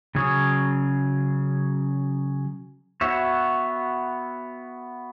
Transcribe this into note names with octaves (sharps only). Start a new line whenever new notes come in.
C#3 F#3 C#4 G#4 C#5
B3 F#4 C#5 E5